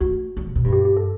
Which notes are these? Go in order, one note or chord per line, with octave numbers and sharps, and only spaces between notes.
A3 F#4
G3
C3
B2
G2
G4
G4
A4